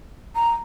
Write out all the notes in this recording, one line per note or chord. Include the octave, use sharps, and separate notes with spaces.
A#5